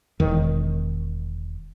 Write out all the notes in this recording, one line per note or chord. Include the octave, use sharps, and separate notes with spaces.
E1 D#3